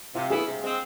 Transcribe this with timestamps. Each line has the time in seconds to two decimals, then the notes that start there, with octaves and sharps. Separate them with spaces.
0.15 C3 F4
0.30 E3 B3 E4 G#4
0.46 C3
0.62 G#3 C4